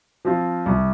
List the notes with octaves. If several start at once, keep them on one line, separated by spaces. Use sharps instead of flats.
F3 C4 F4
C2